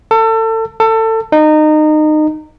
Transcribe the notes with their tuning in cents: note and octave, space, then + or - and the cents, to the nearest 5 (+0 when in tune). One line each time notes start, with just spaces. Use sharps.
A4 +30
A4 +25
D#4 -25